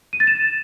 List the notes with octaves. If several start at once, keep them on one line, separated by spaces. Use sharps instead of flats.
D#7
A6
E7